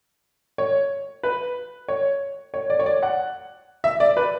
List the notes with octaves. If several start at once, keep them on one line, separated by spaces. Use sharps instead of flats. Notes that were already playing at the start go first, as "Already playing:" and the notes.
C#5
B4
C#5
C#5
D5
C#5
D5
F#5
E5
D5
B4